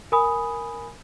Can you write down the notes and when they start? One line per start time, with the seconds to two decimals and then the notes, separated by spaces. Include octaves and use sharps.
0.12 A#4 G#5 B5 D#6